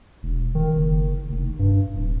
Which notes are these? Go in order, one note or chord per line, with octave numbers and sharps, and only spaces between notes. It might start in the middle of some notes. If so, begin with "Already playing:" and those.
E1
D#3
F#1
F1
G2
D1